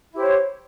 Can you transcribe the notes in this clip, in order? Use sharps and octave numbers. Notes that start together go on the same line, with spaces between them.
E4 G4 C5 C#5